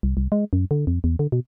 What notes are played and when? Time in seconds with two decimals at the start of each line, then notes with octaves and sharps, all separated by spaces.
0.03 C2
0.17 C2
0.32 G#3
0.53 F#2
0.71 D3
0.87 F2
1.04 E2
1.19 D3
1.32 B2